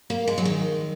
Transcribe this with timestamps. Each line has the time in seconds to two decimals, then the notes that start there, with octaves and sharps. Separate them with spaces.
0.10 A#3
0.27 G#3
0.38 F#3
0.45 D#3